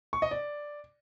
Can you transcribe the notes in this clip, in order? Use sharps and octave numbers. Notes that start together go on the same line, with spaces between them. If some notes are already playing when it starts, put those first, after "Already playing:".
C#6
D#5
D5